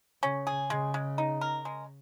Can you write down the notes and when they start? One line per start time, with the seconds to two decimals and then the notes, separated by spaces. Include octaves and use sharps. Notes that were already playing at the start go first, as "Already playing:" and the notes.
0.23 C#3 C#4
0.47 G#4
0.70 C#3 G#3
0.94 G#3
1.18 D#4
1.41 A#4
1.65 G#3